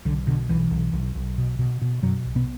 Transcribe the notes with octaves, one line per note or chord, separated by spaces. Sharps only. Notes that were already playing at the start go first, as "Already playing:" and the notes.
B1 D3
B2 D3
B1 E3
B1
B1
B1
B2
B2
B2
F#2 B2 F#3
B1
B2 B3